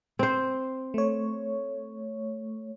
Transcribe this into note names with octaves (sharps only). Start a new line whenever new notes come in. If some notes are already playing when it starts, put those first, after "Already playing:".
C4 C5
A3 C#5